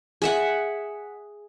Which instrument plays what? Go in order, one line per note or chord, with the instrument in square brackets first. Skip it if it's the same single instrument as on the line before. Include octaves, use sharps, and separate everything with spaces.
[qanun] G#4 E5 F#5